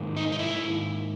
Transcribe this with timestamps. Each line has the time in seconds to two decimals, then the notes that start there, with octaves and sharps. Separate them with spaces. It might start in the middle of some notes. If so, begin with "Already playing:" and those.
Already playing: G#2 D#3 A#3
0.17 D#4
0.32 D#4
0.39 E4